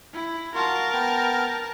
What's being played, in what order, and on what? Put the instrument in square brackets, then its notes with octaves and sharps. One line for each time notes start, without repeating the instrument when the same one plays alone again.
[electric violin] E4
[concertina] F4 F#4 C6 [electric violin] A#4 A5
[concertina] B3 G5 F6